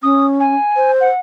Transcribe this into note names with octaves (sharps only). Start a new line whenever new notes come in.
C#4 D#6
G#5
C5
F#5